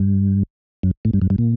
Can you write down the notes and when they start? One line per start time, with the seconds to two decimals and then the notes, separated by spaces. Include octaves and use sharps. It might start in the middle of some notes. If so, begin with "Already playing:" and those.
Already playing: G2
0.83 F#2
1.05 A2
1.13 G2
1.22 F#2
1.30 G2
1.38 A#2